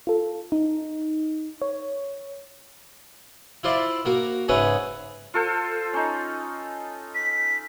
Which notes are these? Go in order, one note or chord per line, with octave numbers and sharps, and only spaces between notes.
F4 A4
D#4
C#5
E4 F4 C5 D5 E5
A#3 F#4 A#4
G#2 C#3 G#4 B4 C#5 E5
F4 A4 C5
C#4 D#4
B6